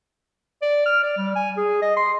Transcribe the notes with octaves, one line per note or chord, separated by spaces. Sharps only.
D5
F6
D5
G3
G#5
G#4
D#5
C6